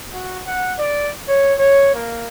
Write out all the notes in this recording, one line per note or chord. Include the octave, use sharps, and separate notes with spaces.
F#4
F#5
D5
C#5
C#5
A#3